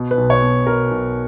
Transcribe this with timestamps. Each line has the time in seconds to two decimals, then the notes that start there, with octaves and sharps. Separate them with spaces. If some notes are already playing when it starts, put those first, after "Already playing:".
Already playing: B2
0.11 B4
0.18 B1
0.30 C#5
0.42 B2
0.67 B2 A#4
0.91 B1